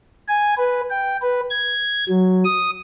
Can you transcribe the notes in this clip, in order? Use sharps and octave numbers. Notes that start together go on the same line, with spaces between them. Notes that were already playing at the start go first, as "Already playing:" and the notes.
G#5
B4
G5
B4
G#6
F#3
D#6